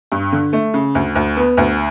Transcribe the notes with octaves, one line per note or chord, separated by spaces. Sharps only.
G2
D3
A3
C#3
D2
D2
B3
D2